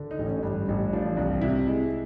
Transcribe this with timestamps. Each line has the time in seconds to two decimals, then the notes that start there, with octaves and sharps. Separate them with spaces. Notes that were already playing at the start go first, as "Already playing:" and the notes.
Already playing: D3
0.11 D#4
0.19 A1
0.27 C#4
0.43 G2
0.68 A1
0.93 F3 D4
1.17 C2
1.41 C3 E4
1.67 G#3